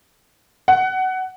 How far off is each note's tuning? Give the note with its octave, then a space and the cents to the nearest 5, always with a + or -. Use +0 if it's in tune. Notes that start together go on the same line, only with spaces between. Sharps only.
F#5 +20